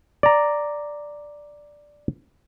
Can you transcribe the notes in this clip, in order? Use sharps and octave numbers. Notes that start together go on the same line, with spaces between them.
D5 A#5